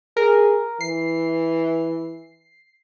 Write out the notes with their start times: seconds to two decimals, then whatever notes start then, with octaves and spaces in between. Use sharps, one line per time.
0.17 G#4 A#4
0.81 E3 C7